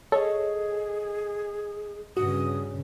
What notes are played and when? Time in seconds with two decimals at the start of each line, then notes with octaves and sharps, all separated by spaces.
0.12 G#4 A4 C#5 D#5
2.17 G2 C#3 F#4 D#6